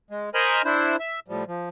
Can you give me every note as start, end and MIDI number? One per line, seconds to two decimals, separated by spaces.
0.10 0.30 56
0.34 0.62 70
0.34 0.62 72
0.34 0.62 75
0.34 0.62 80
0.34 0.62 83
0.34 0.62 89
0.65 0.96 62
0.65 0.96 64
0.65 0.96 72
0.99 1.20 76
1.28 1.44 45
1.28 1.44 53
1.28 1.44 55
1.48 1.69 53